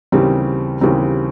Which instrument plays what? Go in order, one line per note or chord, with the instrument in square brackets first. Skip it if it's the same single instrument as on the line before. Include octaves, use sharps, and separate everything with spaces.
[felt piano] D#2 C#3 E3 G3 C4
D#2 C#3 E3 G3 C4